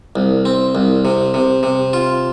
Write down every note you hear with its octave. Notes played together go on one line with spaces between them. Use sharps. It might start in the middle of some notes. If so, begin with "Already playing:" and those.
C2
C4
C2
C3
C3
C3
F4